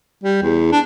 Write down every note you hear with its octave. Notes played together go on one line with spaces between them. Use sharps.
G3
E2
D4